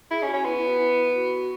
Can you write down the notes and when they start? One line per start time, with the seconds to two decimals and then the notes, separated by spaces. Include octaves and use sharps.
0.11 E4 G#4
0.22 C#4
0.28 F#4
0.33 C#4
0.45 B3 E4
0.57 E4
0.68 F#4
0.79 E4
1.14 F#4